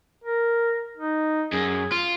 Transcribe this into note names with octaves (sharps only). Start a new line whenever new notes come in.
A#4
D#4
F#2 G#4
F4